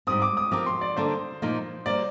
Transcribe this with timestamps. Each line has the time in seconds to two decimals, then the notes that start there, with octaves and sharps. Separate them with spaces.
0.07 G#2 G3 C4 D#6
0.22 D6
0.37 D#6
0.51 F3 C4 G4 A#4 D6
0.66 C6
0.81 D5
0.96 D3 G3 A#3 D4 C5
1.42 A#2 F3 A#3 D#4
1.86 G3 A#3 F4 C5 D5